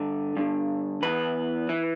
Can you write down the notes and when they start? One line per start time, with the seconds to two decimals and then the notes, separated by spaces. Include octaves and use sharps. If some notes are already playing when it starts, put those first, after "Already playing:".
Already playing: G2 D3
0.37 G2 D3
1.03 E2 E3 B4
1.69 E3